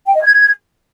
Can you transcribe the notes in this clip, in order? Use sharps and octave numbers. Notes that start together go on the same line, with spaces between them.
G5
D#5
G#6